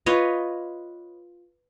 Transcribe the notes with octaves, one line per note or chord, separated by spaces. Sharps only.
F4 B4 C#5 D#5